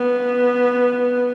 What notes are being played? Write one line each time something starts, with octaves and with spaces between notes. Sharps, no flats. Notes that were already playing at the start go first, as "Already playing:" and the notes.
Already playing: B3